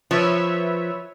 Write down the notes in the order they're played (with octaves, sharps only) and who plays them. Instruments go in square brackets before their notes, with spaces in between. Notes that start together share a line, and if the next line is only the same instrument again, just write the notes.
[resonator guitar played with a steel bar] F3 [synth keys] B4 C#5 E5